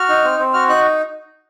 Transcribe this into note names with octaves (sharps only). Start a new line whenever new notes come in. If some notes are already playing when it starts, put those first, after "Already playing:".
Already playing: F#4 F6
D#4
C4
C4
F#4 F6
D#4 F#6